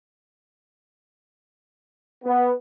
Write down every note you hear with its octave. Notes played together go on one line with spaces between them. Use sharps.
B3